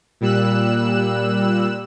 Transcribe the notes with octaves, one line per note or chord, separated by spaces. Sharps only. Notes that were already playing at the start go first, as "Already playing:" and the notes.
A#2 G3 E6 F#6 E7